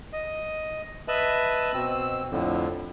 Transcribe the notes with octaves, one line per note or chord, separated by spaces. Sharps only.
D#5
B4 D#5 E5 A5 B5
B2 C4 E6
F2 A2 D3